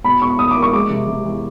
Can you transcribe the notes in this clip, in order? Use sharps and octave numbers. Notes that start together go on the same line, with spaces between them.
B2 B5
B2 C#6
B2 D#6
D6
A#3
C#6
G#3 D6
C3
C3
E2